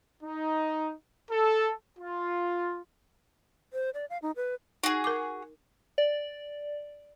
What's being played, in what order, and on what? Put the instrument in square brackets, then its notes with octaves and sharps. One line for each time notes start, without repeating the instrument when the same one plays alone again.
[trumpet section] D#4
A4
F4
[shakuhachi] C5
D5
F5
D#4
B4
[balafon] D#4 [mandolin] F#4 G#4
[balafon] A#4 D6
[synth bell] D5